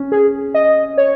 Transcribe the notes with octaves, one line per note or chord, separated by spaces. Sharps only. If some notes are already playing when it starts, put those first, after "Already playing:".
Already playing: C#4
G#4
D#5
C#5